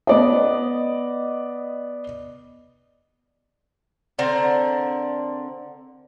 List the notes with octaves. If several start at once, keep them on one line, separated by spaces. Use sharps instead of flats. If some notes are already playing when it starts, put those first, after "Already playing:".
B3 D5 D#5
D3 C4 A#4 A#5